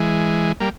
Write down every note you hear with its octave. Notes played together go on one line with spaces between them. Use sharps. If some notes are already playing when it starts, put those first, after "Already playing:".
Already playing: E3 G#3
G3 A#3